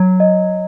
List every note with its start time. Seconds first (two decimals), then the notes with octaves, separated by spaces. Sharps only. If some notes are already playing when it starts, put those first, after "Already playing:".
Already playing: F#3
0.20 D#5